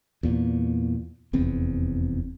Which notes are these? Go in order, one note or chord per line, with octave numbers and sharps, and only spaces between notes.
E2 A#2
F1 E2 C4